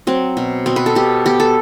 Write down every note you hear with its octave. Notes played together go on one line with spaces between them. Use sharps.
F#3 C4
B2
B2 C4
B4
A4
B2 G4
B3 G4
A4